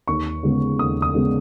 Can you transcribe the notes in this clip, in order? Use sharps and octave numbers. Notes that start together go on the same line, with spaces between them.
D#2 C#6
C#3 G#3 B3
D#2 D#6
D#6
C#3 G#3 B3